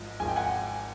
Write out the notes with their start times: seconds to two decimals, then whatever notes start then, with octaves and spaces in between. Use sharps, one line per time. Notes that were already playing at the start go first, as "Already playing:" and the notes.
Already playing: G#1 G#2 F3
0.20 G#1 G#2 F3 G#3 G#5
0.28 G5
0.36 F#5 G#5